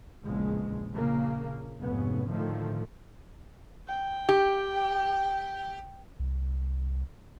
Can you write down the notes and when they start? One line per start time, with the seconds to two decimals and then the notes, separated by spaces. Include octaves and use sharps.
0.24 A#1 E2 C#3 G#3
0.93 A#1 C#3 A#3
1.82 F1 G#2 B3 C#4
2.30 A2 D3 D#3 F3 A3
3.88 G5
4.29 G4
6.20 C2